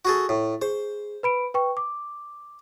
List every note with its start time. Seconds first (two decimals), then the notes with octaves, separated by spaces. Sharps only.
0.05 F#4 G#4 A4
0.29 A2
0.62 G#4 C5
1.23 B4 B5 D7
1.54 B4 G5 C#6
1.77 D6